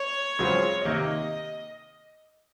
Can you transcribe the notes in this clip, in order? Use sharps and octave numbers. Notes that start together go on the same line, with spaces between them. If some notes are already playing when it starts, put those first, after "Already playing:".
Already playing: C#5
C#2 C#3 F#3 C4 F4
C3 D#3 A#3 D#5